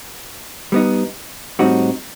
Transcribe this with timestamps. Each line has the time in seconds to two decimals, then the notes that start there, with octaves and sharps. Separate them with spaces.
0.72 G3 B3 D#4
1.59 A2 G3 C4 D#4 F#4